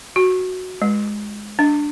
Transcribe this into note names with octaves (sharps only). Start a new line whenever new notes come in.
F#4
G#3
D4